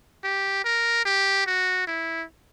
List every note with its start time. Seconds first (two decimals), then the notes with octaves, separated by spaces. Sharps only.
0.24 G4
0.64 A#4
1.05 G4
1.47 F#4
1.87 E4